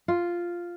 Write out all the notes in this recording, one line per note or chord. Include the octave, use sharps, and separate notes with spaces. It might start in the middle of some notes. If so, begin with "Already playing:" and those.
F4